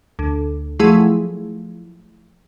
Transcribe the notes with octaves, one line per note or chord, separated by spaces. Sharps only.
D2
F3 F#3 A3 E4 G#4